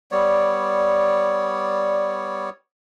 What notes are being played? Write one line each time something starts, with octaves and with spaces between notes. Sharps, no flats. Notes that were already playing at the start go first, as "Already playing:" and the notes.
G3 B3 C#5 D5